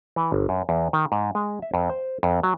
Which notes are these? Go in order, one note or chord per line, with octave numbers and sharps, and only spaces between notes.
E3
G1
F#2
E2
D#3
G#2
G#3
E5
F2
C5
F2
F#3